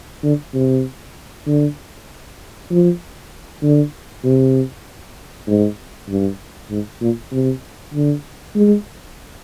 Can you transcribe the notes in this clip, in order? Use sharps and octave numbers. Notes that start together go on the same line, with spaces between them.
D3
C3
D3
F3
D3
C3
G#2
G2
G#2
A#2
C3
D3
G#3